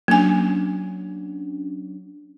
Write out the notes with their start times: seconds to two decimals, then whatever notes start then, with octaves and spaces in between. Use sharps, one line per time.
0.08 F#3 A#3 C#4 D4 G#5